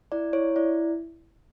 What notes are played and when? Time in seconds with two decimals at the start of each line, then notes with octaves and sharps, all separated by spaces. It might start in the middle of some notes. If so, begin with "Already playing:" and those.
0.12 E4 D5
0.33 E4 C#5
0.56 E4 D5